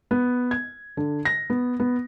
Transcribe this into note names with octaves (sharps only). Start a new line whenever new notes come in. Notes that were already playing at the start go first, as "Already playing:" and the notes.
B3
G#6
D3
A#6
B3
B3